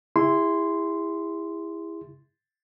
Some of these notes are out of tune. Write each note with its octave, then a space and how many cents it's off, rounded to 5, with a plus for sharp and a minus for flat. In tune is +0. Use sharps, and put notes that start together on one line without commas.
E4 +0 G#4 -40 C6 -10